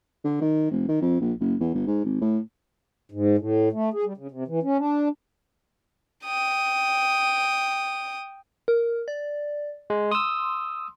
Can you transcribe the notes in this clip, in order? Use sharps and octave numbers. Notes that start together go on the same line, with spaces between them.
D3
D#3
F1
D#3
F2
A#1
F#1
E2
G1
G#2
G#1
A2
G#2
A2
A3
G#4
G3
C#3
C3
E3
C#4
D4
G5 D#6
A#4
D5
G#3
C6 D#6 E6